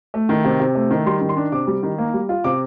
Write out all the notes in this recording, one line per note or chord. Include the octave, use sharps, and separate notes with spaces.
A3
D#3
C3
C3
A3
D#3
G3 C6
D#3
C6
D4
C3 D6
G3
D#3
A#3
G3
F4
C3 D6